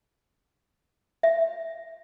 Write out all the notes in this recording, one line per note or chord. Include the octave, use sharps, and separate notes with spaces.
E5